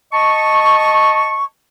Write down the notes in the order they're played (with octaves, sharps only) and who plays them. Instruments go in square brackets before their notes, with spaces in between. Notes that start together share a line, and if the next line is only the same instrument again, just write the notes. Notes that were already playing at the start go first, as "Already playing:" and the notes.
[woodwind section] D#5 A5 C#6